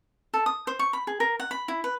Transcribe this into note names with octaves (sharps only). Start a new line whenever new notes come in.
A4
D#6
C5
C#6
B5
G#4
A#4
F#5
B5
E4
B4